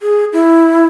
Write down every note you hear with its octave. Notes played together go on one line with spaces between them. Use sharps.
G#4
E4